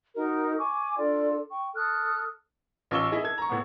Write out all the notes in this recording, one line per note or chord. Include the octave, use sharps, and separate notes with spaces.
D#4 F#4 A#4 D#5
G#5 C#6 D6
D4 F4 A4 D5
G5 C#6
A4 D#6 F6 F#6
A1 F4 C#6 E6 G7
E4 G#4 D#5
A4 G#6
A#5 C#6
A2 B3